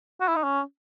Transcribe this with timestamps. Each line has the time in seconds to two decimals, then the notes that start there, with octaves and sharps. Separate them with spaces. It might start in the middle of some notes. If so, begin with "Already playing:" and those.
0.21 F#4
0.28 E4
0.36 D#4
0.43 C#4